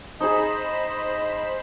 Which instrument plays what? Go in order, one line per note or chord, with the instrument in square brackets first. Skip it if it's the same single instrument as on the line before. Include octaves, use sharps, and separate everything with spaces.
[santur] D#4 G#4 [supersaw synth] C5 B5 E7 [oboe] D#5